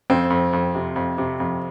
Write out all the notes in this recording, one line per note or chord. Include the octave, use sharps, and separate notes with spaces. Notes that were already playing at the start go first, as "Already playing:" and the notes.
F2 C4
F2
F2
C3
F2
C3
F2